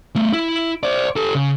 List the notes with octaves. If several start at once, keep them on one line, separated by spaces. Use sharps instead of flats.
A3 B3
E4
C5 D5
G4 A4
C#3